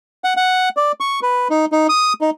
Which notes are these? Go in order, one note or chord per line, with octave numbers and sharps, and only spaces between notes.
F#5
F#5
D5
C#6
B4
D#4
D#4
D#6
D#4